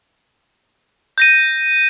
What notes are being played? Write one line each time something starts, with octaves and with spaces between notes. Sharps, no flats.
G6 A#6 D#7